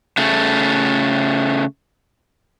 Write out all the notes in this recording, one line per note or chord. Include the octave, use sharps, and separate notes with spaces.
C#3 A3